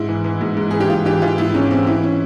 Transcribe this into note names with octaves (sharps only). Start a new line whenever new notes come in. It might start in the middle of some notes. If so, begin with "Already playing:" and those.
Already playing: G#2 E4
E3
E3
G#2
G#2
E3 G#4
G4
G#2 F4
E3 G4
E3 F4
G#2 E4
G#2 C#4
E3 C4
E3 E4
C#4